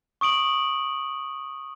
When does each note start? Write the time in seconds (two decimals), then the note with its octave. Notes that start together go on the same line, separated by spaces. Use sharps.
0.21 C#6 D#6 D7 F#7